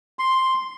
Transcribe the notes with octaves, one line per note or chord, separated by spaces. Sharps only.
C6